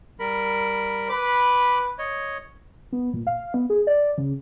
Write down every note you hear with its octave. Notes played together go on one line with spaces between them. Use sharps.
G3 A#4 B5
B4 B5 D6
C#5 D#5
B3
A#2
F5
B3
G#4
D5
C#3